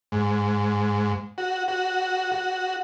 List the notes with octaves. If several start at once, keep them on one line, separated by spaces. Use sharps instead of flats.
G#2
F#4
F#4
F#4